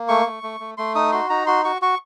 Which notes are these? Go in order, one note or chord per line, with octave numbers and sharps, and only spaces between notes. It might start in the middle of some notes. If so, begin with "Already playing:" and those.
Already playing: A#3
A3 C#6
A3
A3
A3
A3 C6
D#4 D#6
F#4 C6
D#4 A#5
F#4 C6
F#4 C#6
F#4 C#6